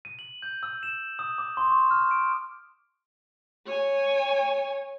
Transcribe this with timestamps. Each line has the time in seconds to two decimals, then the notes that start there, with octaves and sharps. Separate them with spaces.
0.05 D#7
0.19 F#7
0.42 G6
0.63 E6
0.83 E7
1.19 D#6
1.38 D6
1.57 C6
1.71 C#6
1.91 F6
2.11 D7
3.66 C#5 G#5